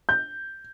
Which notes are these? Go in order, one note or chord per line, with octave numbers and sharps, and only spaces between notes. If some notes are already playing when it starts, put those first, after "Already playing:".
G6